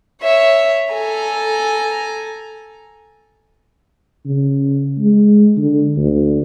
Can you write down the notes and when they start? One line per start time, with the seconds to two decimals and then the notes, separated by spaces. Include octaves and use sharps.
0.22 C#5 E5
0.94 A4 G#5 A#5
4.26 C#3
4.99 G#3
5.57 D3
5.97 D2